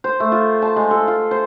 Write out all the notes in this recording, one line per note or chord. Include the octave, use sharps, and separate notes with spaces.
C5
A3
F4
A5
G#3
A4
F4
C5